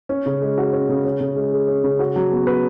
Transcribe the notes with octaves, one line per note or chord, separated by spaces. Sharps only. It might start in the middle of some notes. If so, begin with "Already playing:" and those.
C#4
C#3
G#3
F#4
C#4
C#3
C#4
C#3
G#3
G#4
C#4
C#3
F#4
F#3
B3
B4